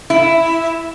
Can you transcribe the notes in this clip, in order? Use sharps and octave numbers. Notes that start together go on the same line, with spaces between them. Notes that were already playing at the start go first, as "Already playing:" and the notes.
E4